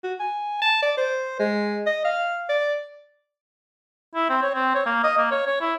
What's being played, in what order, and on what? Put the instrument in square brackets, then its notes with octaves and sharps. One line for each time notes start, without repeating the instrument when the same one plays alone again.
[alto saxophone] F#4
G#5
A5
D5
C5
G#3
D#5
F5
D5
[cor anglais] E4
C4
C#5
C4
C#5
A#3
D#5
A#3
C#5
C#5
E4